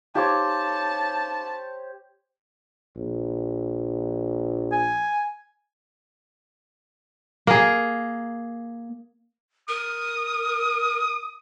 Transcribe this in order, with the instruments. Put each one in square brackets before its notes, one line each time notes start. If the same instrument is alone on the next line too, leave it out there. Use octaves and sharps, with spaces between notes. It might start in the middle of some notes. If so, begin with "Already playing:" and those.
[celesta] D#4 F5 D6 [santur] G4 C5 C#5 [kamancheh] A5
[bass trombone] A#1
[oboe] G#5
[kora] A#3 G#4
[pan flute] A#4 [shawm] D#6